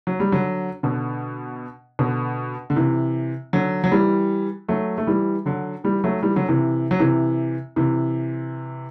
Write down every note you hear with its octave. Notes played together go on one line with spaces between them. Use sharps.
F#3
G3
D3 F#3
B2 D3
B2 D3
D3
C3 E3
D3 F#3
F#3
E3 G3
F#3 A3
A3
E3 G3
D3 F#3
E3 G3
F#3 A3
E3 G3
D3 F#3
C3 E3
F#3
C3 E3
C3 E3